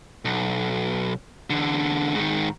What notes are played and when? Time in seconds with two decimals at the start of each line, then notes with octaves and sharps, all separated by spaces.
0.25 B1
1.50 E2 D3
2.15 G#2 D#3